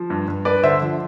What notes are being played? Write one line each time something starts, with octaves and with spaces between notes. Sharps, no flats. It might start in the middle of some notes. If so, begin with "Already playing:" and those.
Already playing: F3
G2
G2
G2 B4 D5
D3 C5 E5
F3